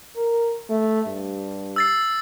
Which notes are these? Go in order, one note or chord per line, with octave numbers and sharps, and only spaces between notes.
A#4
A3
G2
E6 A6 C7